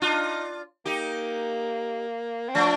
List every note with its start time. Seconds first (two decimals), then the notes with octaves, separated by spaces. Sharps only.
0.01 D4 D#4 F4
0.85 A#3 D#4 G4
2.49 C4
2.55 F3 A3 D4